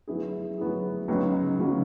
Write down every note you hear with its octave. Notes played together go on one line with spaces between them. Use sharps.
F#3 B3 E4 G#4
F#3 B3 E4 G#4
C#2 C#3 F#3 B3 D#4
C#2 C#3 F#3 B3 D#4